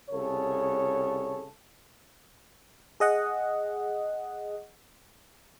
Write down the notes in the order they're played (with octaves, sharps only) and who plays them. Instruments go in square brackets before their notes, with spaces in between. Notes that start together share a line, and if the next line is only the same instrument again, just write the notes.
[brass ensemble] C2 C#3 A4 C#5
[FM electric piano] G#4 D#5 F#5